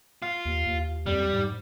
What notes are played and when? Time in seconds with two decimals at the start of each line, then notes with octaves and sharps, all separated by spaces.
0.22 F4
0.45 D#2
0.66 D#2
1.06 F2 G3
1.33 G#2